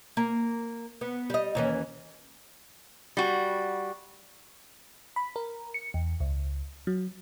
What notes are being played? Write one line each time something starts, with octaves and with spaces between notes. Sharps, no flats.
A#3
B3
G3 D#5
D#2 E3 C#4
G3 F#4
B5
A#4
C#7
E2
C#2
F#3